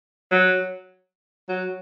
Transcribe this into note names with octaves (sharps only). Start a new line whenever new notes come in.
F#3
F#3